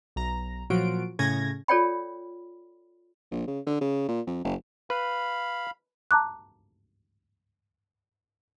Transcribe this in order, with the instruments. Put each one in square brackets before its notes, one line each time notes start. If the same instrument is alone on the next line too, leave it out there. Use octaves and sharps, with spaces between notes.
[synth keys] B1 A#5
A#2 F3 F#3 F4 F#4 D7
A2 C#3 C#4 G#6 A#6
[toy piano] F4 A4 C#5 D5 G5 B5
[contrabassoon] A#1
C#3
D3
C#3
A#2
F2
F#1
[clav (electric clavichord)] B4 [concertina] F5 B5
[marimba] A5 A#5 D6 F#6